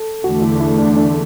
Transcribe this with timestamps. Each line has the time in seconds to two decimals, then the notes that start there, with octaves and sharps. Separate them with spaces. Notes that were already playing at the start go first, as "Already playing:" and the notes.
Already playing: A4
0.24 E2 D3 A3 F#4
0.42 E4
0.60 E4
0.78 D4
0.97 D4